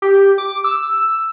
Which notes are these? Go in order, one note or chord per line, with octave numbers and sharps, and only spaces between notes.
G4
D6
E6